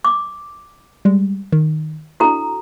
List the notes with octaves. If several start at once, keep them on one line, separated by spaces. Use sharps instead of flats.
D6
G3 G#3
D#3
D4 E4 F#4 A4 A#5